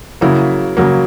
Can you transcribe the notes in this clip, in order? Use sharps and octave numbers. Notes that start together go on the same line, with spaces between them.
C#3 F#3 A#3 E4
C#3 F#3 A#3